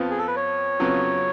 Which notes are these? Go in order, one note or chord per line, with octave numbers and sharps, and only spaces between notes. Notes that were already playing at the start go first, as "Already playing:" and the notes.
Already playing: F2 F3 B3 F4
G#4
A4
B4
C#5
F2 C#3 F#3 B3 F4